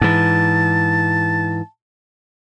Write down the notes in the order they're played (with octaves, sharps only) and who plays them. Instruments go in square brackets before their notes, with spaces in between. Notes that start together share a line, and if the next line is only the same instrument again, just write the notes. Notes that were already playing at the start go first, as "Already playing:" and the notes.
[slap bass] G#2 E3 [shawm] A5